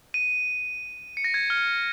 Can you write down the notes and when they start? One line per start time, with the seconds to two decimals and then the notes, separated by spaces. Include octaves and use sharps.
0.14 D#7
1.17 C#7
1.24 A#6
1.34 G#6
1.50 F6